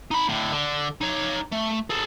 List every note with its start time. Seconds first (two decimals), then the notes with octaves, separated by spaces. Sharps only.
0.11 D#4 B5
0.29 A2 D3
0.52 D3
1.01 D#4 C#5
1.52 A3
1.90 G#4 A4